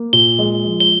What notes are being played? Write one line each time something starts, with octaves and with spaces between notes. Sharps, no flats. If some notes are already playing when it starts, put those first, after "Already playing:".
Already playing: A#3
A#2 G7
G#3
F3
G7